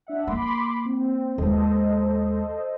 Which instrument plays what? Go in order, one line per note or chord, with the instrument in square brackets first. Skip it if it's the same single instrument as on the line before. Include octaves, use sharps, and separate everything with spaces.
[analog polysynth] D4 E5 F#5
[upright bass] A#3 [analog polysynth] B5 C6 D6
[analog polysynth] C4
[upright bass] D#2 G#3 [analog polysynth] A4 C5 D#5